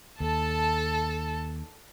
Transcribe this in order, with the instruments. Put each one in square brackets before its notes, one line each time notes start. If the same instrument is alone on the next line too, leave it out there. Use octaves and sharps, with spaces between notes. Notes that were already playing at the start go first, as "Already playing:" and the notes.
[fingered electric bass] D#2 [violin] A4 A5